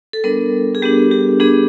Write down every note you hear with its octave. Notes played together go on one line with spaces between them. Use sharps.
A4
G3 B3 D4 A#4
G#4
G3 B3 D4 G4
G4
G3 B3 D4 G#4